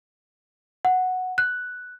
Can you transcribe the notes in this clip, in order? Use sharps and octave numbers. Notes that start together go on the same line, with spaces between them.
F#5
F#6